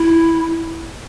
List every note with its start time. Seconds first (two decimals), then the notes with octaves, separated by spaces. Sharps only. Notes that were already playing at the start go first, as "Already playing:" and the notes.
Already playing: E4